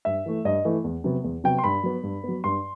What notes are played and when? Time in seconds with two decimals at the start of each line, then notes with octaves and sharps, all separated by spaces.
0.05 G2 E5
0.26 E3 A3
0.45 G2 D#5
0.65 E3 A3
0.84 E2
1.04 C3 F#3 B3
1.24 E2
1.44 C3 F#3 B3 G5
1.59 C6
1.64 G2 B5
1.83 F#3 B3
2.03 G2
2.24 F#3 B3
2.44 G2 C6